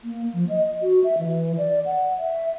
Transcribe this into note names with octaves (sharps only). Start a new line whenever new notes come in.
A#3
F3
D#5
F#4
E5
E3
D5
F#5
E5